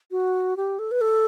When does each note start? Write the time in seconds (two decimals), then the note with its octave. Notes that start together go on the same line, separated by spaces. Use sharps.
0.11 F#4
0.57 G4
0.79 A4
0.91 B4
1.01 A4